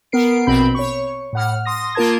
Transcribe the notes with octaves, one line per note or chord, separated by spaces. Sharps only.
B3 A#4 C7 D7
A#1 B2 C4 B5 G6
C#5 C#6
A2 F#5 F6
C6 D#6 A#6
A#3 F4 A#4 A5 G#6